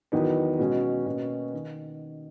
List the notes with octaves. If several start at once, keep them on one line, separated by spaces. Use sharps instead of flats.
E2 D#3 F#3 B3 D#4
B2 G#3 C#4 F#4
B2 A#3 C#4 F#4
D#3